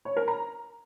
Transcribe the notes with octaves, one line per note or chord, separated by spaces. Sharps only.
C#5
A#4
A#5